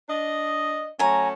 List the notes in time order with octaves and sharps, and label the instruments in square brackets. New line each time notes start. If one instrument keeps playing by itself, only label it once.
[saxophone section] D4 D#5
[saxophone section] F#3 A3 C#4 [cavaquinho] G#5 A#5